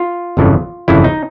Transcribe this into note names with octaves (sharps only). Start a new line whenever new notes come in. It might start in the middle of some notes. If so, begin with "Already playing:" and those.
Already playing: F4
G1 F2 C#3 E3
G1 F2 C#3 E3 E4
D#4